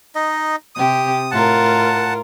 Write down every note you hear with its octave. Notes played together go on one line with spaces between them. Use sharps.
D#4 D#5
C3 G4 D#6
A2 F4 A#4 F#5 A5